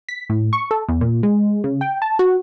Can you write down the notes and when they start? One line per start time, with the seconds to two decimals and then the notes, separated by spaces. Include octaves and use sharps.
0.09 B6
0.30 A2
0.53 C#6
0.71 A4
0.88 E2
1.01 A#2
1.23 G#3
1.64 C#3
1.81 G5
2.02 A5
2.19 F#4